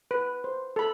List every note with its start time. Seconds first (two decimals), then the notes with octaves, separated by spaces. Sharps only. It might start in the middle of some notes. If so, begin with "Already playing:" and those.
0.11 B4
0.44 C5
0.76 A4 B5